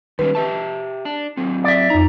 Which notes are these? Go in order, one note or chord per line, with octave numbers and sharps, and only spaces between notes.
D#3 G3 C#4 B4
G4 E5 A5
D4
F#3 C4
D5 E5
F2 D#4 A#5